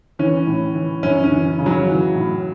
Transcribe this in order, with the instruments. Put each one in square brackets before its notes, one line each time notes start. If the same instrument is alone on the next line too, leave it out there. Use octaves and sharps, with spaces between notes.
[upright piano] E3 C#4
A2
E3
F#2 C#4
C#4
E3
C#3
F#3
E3
A2